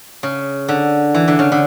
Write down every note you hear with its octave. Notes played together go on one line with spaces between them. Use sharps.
C#3
D3
E3
D3
C#3
D3